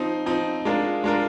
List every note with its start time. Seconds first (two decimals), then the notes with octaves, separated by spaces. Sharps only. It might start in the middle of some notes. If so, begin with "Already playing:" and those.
Already playing: F3 C4 D#4
0.26 F3 C4 D#4
0.65 G#3 D4 F4 A#4
1.04 G#3 D4 F4 A#4